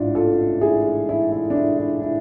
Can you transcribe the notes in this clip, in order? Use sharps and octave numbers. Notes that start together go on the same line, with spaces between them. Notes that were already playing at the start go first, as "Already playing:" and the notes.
Already playing: A1 G#2 D4 E4 F4
F4 A4
E4 G#4
E4
E4
D4
E4
E4
E4